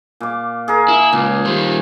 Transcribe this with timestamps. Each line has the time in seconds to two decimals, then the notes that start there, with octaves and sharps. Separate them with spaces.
0.20 A#2 D6
0.68 G#4 A#4
0.88 E4
1.13 C#2 A#2
1.45 D#3 G3 C5